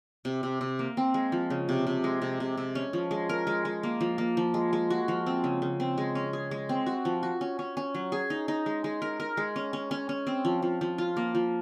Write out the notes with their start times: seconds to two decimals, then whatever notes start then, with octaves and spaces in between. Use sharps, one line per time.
0.25 C3
0.43 C3
0.61 C3
0.79 A#3
0.97 C4
1.14 G#3
1.32 F3
1.50 C#3
1.69 C3
1.87 C3
2.04 G#3
2.22 C3
2.40 C3
2.57 C3
2.75 C#4
2.93 F3
3.11 G#3
3.29 A#4
3.47 G#3
3.65 G#3
3.83 A#3
4.01 F3
4.18 A#3
4.37 F3
4.54 G#3
4.73 G#3
4.90 F#4
5.08 F3
5.26 C4
5.44 C#3
5.62 C#3
5.80 C4
5.98 G#3
6.15 C#4
6.33 G#4
6.51 G#3
6.69 C4
6.86 F#4
7.05 F3
7.23 F#4
7.41 C#4
7.59 C#4
7.77 C#4
7.94 F#3
8.12 G#4
8.30 D#4
8.48 D#4
8.66 G#3
8.84 G#3
9.02 A#4
9.20 A#4
9.37 G#3
9.56 C#4
9.73 C#4
9.91 C#4
10.09 C#4
10.27 C4
10.45 F3
10.62 F3
10.81 F3
10.98 F4
11.17 A#3
11.35 F3